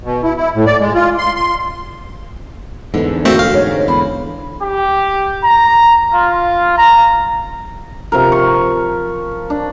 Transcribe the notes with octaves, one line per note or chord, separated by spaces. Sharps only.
B2
E4
E4
A2
D5
G#3
F4
C6
C6
E2 G#2 D3 E3
A3 A#3 C4 F#4
F5
G#2 C#5
E2 C5 B5
G4
A#5
F4
A#5
C3 F3 A#4
C6 C#6
D4